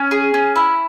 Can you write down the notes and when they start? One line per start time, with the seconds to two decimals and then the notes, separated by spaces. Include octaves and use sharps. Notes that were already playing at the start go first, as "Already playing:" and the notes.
Already playing: C#4
0.11 G#4
0.34 C#4
0.56 E4